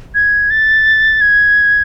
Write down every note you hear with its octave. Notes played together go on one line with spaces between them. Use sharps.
G#6
A6
G#6